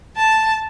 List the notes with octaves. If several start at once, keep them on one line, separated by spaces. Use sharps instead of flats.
A5